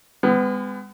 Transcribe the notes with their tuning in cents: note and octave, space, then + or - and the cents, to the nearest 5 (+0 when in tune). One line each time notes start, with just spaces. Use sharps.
G#3 -35 B3 +30